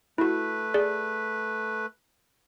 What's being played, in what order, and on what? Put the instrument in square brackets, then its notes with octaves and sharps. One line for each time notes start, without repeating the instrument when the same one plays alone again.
[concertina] A3 B4 [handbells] E4 F#4
[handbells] G#4 D5